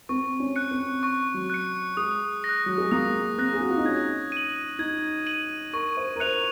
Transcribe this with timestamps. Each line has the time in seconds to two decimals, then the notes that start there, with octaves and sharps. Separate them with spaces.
0.09 C4 C#6
0.40 C#4
0.56 F#6 C#7
0.71 C4
1.03 C#6
1.34 F#3
1.50 F#6 C#7
1.97 G#3 D#6
2.44 A#6
2.49 F#6
2.66 F#3
2.78 G#3
2.91 A#3 D#6
3.38 C4 F#6 A#6
3.53 G#4
3.61 F#4
3.70 F4
3.77 D#4
3.85 C#4 G#6
4.32 D#7 F#7
4.79 D#4 G#6
5.27 D#7 F#7
5.73 A#4 C#6
5.97 C5
6.16 A#4
6.20 C5 F#6 C#7 F7